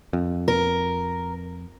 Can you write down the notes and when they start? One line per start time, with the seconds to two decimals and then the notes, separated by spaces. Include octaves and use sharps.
0.13 F2
0.48 A#4